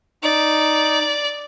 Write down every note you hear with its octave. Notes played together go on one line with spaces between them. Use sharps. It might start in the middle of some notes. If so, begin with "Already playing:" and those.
D#4 D5